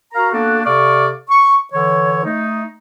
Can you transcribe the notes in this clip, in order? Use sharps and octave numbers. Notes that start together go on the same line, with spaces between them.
F#4 A#4 F5 A#5
A#3 B3 D4 F#4 A4
C3 A4 D5 F5 C#6
C#6
D3 E3 C#5
A3 D#4